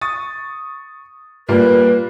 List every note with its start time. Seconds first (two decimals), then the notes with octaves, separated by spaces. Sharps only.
0.01 C#6 D#6 A6
1.49 A#2 G3 A#3 B4